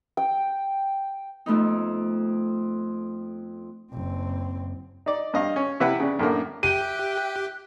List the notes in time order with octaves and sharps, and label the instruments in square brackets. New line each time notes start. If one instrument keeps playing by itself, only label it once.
[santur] G5
[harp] F2 A3 B3 D#4
[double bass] F#1 C4
[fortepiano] D#4 D5
G2 D#5 F5
C#4
C3 E4 B4 F#5
C#3 D4
F#2 A2 D3 A#3
[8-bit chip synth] G4 [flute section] E5 F#6 [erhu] G5 [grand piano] D#7